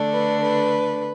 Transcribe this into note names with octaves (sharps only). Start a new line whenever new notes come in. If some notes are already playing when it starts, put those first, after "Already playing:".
Already playing: D3 A3 D4
B4
B4